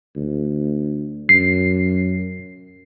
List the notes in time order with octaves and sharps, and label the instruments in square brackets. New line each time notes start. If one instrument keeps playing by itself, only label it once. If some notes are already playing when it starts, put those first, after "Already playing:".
[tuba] D2
[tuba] F#2 [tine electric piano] C7